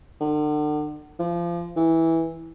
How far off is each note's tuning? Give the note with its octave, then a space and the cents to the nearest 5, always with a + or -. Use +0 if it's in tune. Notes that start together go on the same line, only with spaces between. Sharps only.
D3 +40
F3 -25
E3 -10